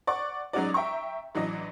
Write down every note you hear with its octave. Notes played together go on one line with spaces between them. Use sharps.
D5 F#5 C#6
F#3 G#3 C#4 D#4 F#4 D5
E5 G5 A#5 C#6
A1 E3 F#3 D4 D#5